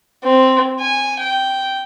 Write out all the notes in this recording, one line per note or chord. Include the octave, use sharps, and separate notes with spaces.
C4
G#5
G5